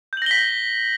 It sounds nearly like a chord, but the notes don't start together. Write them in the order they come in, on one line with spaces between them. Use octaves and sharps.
G6 F#7 A#6 G7 B6